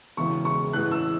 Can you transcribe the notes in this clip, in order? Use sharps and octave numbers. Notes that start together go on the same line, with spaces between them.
E1 E2 C#3 C#6
C#6
A1 A2 E3 F#6
E6